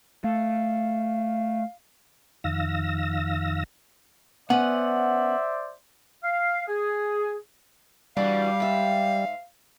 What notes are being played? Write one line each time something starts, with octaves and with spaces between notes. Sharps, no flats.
A3 F5
F2 D#3 F5 E6 A#6
B3 C#4 C5 D5 E5 F#5
F5
G#4
E3 G3 D4 F#4 F5
G#2 E5